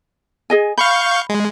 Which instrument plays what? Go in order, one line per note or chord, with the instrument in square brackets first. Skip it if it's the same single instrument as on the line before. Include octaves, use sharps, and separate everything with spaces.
[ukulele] G#4 D#5 G#5
[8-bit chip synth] F5 C#6 G6 [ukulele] B5
[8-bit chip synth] G#3